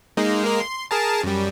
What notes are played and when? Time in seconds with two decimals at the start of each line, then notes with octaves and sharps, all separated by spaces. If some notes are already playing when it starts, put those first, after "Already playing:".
0.17 G#3 A#3 D#4
0.42 G#3 A#3 A#4
0.60 C6
0.91 G#4 A#4 A5
1.23 F#2 G3